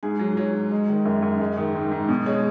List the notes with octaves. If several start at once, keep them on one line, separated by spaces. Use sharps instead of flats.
G#2 G#4
F#3
F#3 C#5
G#2
G#3
D#3
F#2
F#2
G#3
D#3
G#2
G#2
B2
G#3 C#5